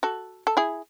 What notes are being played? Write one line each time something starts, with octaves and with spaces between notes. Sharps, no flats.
F#4 A4
A4
E4 G#4